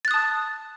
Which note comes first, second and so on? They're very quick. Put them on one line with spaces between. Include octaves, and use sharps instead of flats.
A6 F#6 D#6 A5